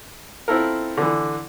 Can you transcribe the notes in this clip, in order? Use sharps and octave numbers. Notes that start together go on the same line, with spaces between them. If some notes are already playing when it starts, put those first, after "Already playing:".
C4 E4 F4 A4 A#4
D3 E3